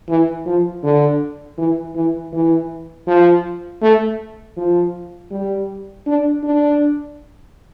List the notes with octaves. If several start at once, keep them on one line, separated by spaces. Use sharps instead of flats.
E3
F3
D3
E3
E3
E3
F3
A3
F3
G3
D4
D4